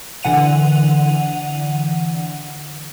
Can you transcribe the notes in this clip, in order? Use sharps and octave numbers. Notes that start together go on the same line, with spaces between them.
D3 E3 F#5 D#7 F7